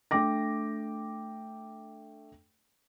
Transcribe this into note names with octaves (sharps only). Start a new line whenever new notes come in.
A3 D4 G5 D6 A#6